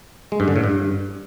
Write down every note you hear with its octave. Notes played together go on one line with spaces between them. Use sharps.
G#3
G2
D3
A2
G2